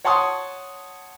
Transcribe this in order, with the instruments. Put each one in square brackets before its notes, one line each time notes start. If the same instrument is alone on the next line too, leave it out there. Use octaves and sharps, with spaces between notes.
[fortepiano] C#5 F#5 A5 C6 C#6 D#6